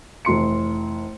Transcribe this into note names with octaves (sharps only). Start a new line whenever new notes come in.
F1 E3 C6 C#7